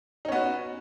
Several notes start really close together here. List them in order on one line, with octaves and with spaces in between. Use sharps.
D#4 C#4 B3 F#4